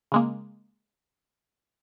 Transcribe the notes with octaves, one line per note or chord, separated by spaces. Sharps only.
C#3 G#3 A#3